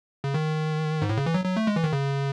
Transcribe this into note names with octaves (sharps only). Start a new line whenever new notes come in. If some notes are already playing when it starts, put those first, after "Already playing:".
C#3
D#3
G#2
A2
C#3
E3
F#3
F#3
A3
G#3
E3
D#3
C#3